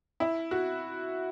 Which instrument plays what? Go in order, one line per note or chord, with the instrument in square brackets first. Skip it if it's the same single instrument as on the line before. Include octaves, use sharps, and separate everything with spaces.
[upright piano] E4
F#4